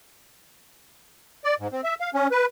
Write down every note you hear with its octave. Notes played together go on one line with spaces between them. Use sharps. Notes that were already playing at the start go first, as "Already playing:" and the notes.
D5
G#2
C4
E5
F5
C#4
B4